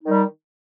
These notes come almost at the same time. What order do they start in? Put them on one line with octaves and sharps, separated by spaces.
D#4 D#3 G3